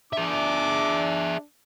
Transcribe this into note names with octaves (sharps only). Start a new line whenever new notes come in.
D4 G#4 E5 D6